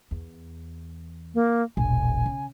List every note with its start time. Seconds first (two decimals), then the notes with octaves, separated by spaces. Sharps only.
0.11 E2
1.34 A#3
1.77 E1 A#1 G#5
2.26 C#3